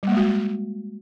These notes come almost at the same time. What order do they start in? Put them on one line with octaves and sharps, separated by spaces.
G3 A#3 G#3 F#4